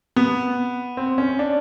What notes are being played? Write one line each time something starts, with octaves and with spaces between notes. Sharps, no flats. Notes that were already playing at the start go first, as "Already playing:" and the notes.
B3
C4
C#4
D4